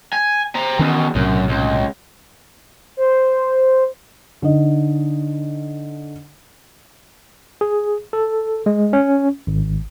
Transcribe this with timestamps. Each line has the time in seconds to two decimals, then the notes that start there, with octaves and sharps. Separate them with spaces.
0.13 G#5
0.55 C4 A#5
0.79 E2 B2 D#3 C#4
1.15 B1 F#2 A2 C3
1.49 C#2
2.97 C5
4.42 D3 D#4 D#5
7.61 G#4
8.13 A4
8.66 G#3
8.93 C#4
9.47 G#1